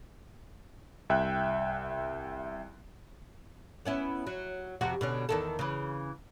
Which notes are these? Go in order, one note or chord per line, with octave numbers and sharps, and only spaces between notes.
C2 E5 G5 F#6
B3 C#4 E4
F#3
F2 C3 F#4
B2 D3 C#4
E2 D#3 A4
C#3 E3